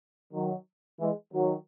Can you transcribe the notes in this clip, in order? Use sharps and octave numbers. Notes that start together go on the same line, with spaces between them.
D#3 F#3
E3 G#3
D#3 F#3